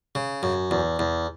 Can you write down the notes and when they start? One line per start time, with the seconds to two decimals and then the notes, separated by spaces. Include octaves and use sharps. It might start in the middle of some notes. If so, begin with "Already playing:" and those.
0.15 C#3
0.43 F#2
0.71 E2
0.99 E2